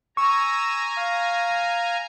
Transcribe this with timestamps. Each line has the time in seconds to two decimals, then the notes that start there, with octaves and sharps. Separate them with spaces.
0.17 G#5 A#5 C#6 E6
0.97 F5